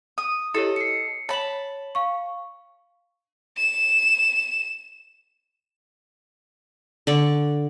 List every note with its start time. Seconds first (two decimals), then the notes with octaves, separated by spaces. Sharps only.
0.18 D#6
0.54 E4 G4 A4 C#5 D#5
0.76 C7 C#7
1.29 C#5 A5 B5 F#7
1.95 F5 C#6
3.57 E7
7.07 D3 D5 C#6